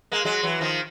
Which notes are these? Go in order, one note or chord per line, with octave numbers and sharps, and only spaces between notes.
G#3 A#3
F#3 G#3
E3 F#3
D#3 F3